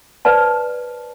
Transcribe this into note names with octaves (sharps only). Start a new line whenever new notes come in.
B4 C5 D5 A5